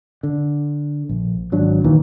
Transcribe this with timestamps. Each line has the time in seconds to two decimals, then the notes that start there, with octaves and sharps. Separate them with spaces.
0.23 D3
1.09 A#1
1.52 G#1 F#3 D4
1.84 D#2 A#2 D#3 E3